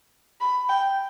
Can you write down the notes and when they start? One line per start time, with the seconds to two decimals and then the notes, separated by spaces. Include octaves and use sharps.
0.40 B5
0.69 G5